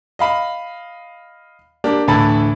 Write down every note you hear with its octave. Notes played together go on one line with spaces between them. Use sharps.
D#5 F5 B5
A#3 D4 G4 A#4
D2 A2 E3 A5 B5 A6